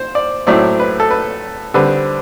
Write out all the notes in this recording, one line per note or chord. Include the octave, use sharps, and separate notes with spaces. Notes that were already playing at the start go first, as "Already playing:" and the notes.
Already playing: C5
D5
A2 F#3 A3 C4 D5
B4
A4
B4
D3 G3 C4 B4